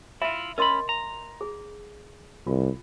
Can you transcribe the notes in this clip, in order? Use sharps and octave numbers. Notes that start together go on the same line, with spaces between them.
E4 F4 E5 B5
C#4 A#4 D#5 B5 C6
A#5
G#4
C2 F4